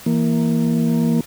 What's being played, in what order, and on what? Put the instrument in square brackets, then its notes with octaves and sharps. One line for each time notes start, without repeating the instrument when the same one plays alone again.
[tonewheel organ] E3 A#3